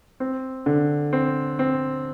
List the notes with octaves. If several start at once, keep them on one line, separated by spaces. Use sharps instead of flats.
C4
D3
C4
C4